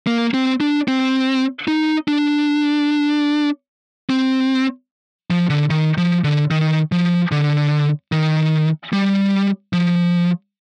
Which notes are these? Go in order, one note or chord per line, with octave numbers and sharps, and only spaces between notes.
A#3
C4
D4
C4
D#4
D4
C4
F3
D3
D#3
F3
D3
D#3
F3
D3
D#3
G3
F3